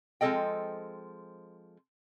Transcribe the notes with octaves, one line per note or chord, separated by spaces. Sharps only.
F3 G#3 C4 A4 D#5 G5